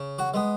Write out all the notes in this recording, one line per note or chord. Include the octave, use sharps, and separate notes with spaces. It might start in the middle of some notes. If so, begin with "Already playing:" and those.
Already playing: C#3
F#4
G#3 B3